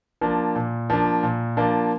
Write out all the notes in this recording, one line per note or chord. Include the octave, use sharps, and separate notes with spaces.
F3 A#3 D4
A#2
F3 A#3 D4
A#2
F3 A#3 D4